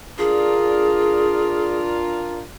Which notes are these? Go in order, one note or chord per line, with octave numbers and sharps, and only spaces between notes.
D4 F4 G#4 A#4